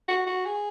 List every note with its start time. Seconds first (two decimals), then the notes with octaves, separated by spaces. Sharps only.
0.08 F#4
0.27 F#4
0.46 G#4